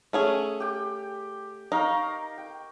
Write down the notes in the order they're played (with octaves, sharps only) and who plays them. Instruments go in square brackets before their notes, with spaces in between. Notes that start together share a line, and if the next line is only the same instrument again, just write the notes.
[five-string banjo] A3 C#4 G#4
[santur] G4 G5
[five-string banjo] D#4 [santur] A#4 F5 C#6
[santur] G5